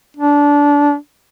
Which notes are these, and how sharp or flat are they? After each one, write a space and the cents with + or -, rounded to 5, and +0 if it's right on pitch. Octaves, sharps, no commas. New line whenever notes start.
D4 -20